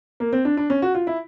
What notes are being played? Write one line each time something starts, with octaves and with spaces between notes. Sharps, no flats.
A#3
C4
D4
D4
C#4
F#4
F4
E4